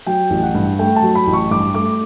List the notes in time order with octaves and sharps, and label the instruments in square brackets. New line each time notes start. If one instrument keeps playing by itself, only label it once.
[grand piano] F#3 G5
A1
F#5
G2
A3 G5
A5
F#3
B5
A1
C#6
G2 D6
A3 D6